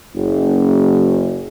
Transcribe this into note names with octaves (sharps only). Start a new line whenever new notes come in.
F#1